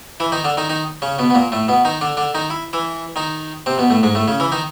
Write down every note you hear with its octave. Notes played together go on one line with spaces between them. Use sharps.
E3 E4
D#3 D#4
D3 D4
D#3 D#4
D#3 D#4
C#3 C#4
B2 B3
B3
A#2 A#3
A2 A3
B2 B3
D#3 D#4
D3 D4
D3 D4
D#3 D#4
E4
E3 E4
D#3 D#4
C3 C4
B2 B3
A2 A3
G#2 G#3
A2 A3
C#3 C#4
E3 E4
D#3 D#4